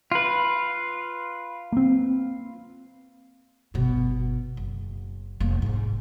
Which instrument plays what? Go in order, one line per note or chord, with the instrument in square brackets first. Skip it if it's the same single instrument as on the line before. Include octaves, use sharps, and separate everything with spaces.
[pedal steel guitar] F4 B4
[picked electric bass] A#3 C4
[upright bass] G1 B2
F#1
F1 A#3
F1 G#2